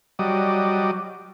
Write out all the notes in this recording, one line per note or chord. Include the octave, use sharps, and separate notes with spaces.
F#3 G3 D5 D#5